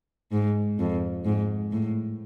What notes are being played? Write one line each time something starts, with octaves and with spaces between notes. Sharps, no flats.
G#2
F2
G#2
A2